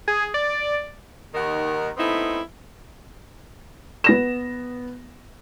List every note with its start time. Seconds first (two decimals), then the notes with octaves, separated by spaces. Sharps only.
0.08 G#4
0.34 D5
1.34 D#2 D#3 D#4 A#4 F#5
1.97 A3 B3 C4 D#4 E4
4.04 B3 A#6 E7